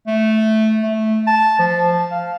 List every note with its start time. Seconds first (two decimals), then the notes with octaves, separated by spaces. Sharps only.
0.07 A3
0.83 A3
1.27 A5
1.59 F3
2.11 F5